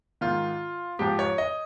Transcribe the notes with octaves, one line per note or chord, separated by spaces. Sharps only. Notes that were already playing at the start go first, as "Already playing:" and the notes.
G#2 D#3 F4
G#2 F3 G4
C#5
D#5